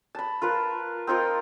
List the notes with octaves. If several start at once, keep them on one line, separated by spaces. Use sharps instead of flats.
A5 B5
F4 A#4 B4 A5
C4 D#4 F4 A#4